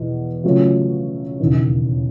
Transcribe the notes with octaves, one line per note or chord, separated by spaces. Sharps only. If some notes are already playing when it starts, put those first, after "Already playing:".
Already playing: E2 B2
C#3 F#3 A3 C#4 F4
E1 D#2 C#3 E3